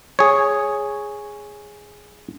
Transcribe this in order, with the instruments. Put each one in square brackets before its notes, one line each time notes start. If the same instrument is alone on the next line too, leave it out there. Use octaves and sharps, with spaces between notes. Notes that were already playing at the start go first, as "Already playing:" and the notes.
[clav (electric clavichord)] G#4 C#5